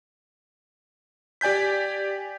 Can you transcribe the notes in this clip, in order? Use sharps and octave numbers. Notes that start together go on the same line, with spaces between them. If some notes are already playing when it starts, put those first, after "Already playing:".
G4 D5 G#5 G6 B6